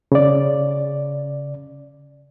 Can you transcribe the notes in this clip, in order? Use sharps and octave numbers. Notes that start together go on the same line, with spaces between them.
C#3 D5